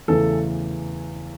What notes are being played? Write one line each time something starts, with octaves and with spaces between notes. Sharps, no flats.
E2 C#3 E3 A3 A4